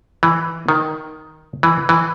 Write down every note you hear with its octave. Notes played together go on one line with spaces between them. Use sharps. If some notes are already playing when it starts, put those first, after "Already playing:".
E3
D#3
E3
E3